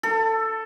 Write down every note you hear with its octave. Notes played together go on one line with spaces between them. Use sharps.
A4